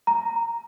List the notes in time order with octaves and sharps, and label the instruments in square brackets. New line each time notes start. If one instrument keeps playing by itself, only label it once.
[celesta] A#5